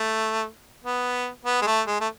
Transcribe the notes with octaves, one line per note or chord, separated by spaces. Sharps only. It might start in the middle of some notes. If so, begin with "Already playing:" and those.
Already playing: A3
B3
B3
G#3
A3
G#3
A3